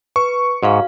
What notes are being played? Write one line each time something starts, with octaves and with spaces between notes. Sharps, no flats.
B4 C#6
G#2 F#4 F5